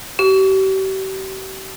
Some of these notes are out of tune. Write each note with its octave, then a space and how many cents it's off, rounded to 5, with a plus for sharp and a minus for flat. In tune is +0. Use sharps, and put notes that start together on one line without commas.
G4 -40